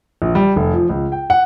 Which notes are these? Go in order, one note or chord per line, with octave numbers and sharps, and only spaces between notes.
A#1
G3
F1
F3
C#2
G5
F#5